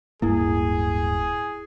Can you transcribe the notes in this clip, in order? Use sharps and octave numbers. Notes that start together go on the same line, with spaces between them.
D1 G2 A#3 E4 G#4